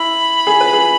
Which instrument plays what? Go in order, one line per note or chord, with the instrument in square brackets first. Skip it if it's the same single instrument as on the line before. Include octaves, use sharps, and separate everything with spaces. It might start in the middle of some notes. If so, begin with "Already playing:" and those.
Already playing: [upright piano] E4 [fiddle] B5
[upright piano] G#4
B4
G#4